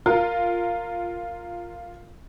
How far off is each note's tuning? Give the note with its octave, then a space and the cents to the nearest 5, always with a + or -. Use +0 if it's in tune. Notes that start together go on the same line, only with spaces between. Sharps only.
F4 +0 A#4 -20